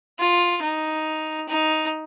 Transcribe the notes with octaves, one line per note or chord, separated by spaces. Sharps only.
F4
D#4
D#4